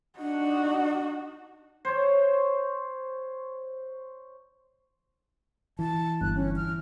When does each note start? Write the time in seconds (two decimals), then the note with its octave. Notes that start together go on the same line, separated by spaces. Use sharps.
0.19 D4 D#4 F#4
1.85 C5 C#5
5.79 E3 A5
6.21 G1 F#6
6.35 C#4
6.56 F6